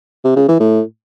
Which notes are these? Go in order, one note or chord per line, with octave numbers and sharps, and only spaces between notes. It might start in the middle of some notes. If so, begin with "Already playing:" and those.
C3
C#3
E3
A2